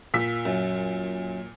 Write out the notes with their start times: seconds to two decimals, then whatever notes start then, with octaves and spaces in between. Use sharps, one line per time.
0.14 A#2 E6 B6
0.45 F#2